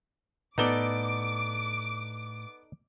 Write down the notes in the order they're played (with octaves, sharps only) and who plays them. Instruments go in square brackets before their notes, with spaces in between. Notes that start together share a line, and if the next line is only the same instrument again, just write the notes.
[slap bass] A2 [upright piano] B3 G7 [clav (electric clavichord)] D#4 A4 D5 [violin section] D6